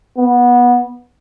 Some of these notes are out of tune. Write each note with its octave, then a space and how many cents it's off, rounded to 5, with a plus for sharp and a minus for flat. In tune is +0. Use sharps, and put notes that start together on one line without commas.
B3 -20